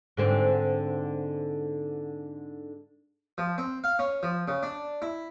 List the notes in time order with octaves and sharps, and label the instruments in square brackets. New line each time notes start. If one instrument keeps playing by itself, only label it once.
[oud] G#2 D3 C4
[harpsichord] F3
C4
F5
C#4
F3
C#3
D4
E4